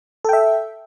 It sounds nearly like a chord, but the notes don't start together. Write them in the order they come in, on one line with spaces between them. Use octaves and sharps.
A4 G5 E5